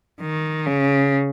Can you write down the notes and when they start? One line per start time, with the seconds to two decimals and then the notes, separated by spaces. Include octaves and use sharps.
0.21 D#3
0.67 C#3